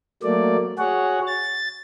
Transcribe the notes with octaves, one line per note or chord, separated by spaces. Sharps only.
F#3 A3 A#3 D5
F#4 G#4 C#5 F#5
A6